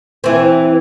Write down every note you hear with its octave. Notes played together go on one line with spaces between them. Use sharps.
E3 C4